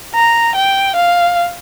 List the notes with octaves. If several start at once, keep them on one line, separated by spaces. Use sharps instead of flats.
A#5
G5
F5